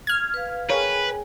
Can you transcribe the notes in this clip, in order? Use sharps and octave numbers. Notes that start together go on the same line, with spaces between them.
F6 G#6
B4 F5
G#4 A#4 B4 C#5 F5 G5 G#5